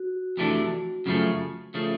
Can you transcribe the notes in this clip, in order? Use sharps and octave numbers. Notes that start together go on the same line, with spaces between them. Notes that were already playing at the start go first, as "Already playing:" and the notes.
Already playing: F#4
F2 C3 E3 A3 D4
F#2 C#3 F3 A3
C#3 F3 A3 C#4